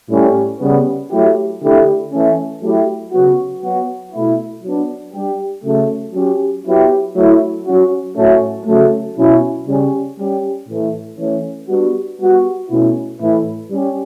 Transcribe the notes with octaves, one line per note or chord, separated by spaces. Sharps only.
A2 G3 C#4 E4 G4
C#3 G3 B3
F#3 A3 E4 G4
D3 A3 E4 G4
E3 A3 C#4
F#3 A3 E4 G4
C#3 F#3 B3 F#4
F#3 B3 F#4
B2 A3 E4
F#3 B3 D4
G3 D4 G4
C#3 F#3 A3
F#3 C#4 G4
F#3 B3 E4 G4
F#3 A3 E4
F#3 C#4 F#4
A2 F#3 A3 C#4 F#4
C#3 F#3 A3
B2 F#3 C#4 E4
C#3 G3 C#4 G4
G3 C#4 G4
A2 E3 A3
E3 A3 C#4
G3 B3 D4 F#4
G3 B3 F#4
B2 A3 C#4 E4
A2 E3 A3 E4
G3 C#4 G4